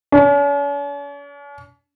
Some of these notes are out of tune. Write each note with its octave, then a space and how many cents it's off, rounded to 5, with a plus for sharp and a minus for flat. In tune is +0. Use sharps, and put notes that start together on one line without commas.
C#4 +45